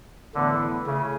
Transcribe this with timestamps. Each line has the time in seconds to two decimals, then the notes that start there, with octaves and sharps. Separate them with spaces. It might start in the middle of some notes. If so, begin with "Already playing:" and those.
0.35 A2 D3 E3 B3 E4 B4
0.86 C#3 A3 E4 G#4